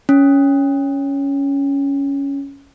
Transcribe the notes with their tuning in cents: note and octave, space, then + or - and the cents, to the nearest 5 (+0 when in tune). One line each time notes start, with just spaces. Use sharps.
C#4 +10